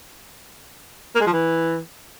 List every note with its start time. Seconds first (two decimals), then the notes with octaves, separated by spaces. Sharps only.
1.15 A#3
1.21 G#3
1.27 F3
1.33 E3